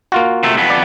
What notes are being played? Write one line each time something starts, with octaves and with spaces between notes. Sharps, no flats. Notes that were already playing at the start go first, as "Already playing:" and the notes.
A#3 F4 F#4
C3 A3
F2 B3
D5